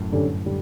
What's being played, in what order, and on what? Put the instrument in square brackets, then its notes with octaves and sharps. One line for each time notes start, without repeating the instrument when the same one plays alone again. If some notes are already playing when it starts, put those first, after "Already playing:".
Already playing: [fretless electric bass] F#2 A2
[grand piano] G2 D3 G3 C#4
D3 G3